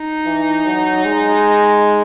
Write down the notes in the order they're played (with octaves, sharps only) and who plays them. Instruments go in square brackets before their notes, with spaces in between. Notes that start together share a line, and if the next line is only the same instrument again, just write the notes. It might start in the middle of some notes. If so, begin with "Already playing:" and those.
Already playing: [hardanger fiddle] D#4
[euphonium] E3
F#3
G#3